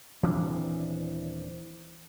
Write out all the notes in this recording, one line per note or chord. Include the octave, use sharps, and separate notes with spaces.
D#1 E3 C4 D4